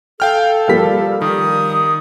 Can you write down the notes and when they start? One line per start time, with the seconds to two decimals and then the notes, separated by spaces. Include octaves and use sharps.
0.20 A4 F5 G5 F6
0.68 F3 G3 A#3 F5 B6
1.22 D#3 D#6